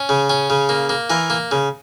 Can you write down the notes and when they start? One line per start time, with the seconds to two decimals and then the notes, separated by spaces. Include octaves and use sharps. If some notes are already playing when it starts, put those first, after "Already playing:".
Already playing: C#4
0.09 C#3
0.30 C#4
0.50 C#3
0.69 A#3
0.89 A#3
1.10 E3 A#4
1.30 A#3
1.51 C#3